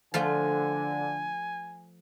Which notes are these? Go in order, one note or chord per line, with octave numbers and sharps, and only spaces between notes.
D3 F3 A3 F4 G#5